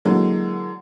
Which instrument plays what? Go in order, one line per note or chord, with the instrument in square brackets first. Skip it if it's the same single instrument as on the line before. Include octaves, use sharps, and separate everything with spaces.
[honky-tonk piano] D3 E3 F#3 G#3 A#3